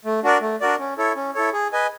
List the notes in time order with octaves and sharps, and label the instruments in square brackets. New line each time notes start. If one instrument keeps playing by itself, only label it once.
[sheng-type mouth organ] A3
D4 F#4 A#4 D5
A3
D4 F#4 A#4 D5
C#4
E4 A4 C#5
C#4
E4 A4 C#5
G#4
B4 D#5 G#5